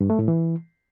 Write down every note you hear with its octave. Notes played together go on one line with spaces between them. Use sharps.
G2
A3
A2
E3